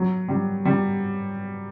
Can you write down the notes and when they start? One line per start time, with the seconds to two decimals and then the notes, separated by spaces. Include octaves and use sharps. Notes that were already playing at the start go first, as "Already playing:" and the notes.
Already playing: F#3
0.28 G3
0.65 G3